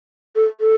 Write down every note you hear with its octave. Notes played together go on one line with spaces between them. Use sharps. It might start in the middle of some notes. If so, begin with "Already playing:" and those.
A4
A4